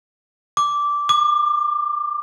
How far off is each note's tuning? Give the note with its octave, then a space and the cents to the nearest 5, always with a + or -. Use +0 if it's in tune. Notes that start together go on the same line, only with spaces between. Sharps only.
D6 -10
D6 +30